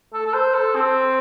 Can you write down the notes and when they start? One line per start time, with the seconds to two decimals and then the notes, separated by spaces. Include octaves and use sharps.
0.14 A4
0.27 A4
0.34 C5
0.55 A4
0.75 C4